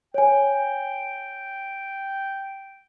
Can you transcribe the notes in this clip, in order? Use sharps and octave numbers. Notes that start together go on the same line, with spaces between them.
C#5 G5 G#5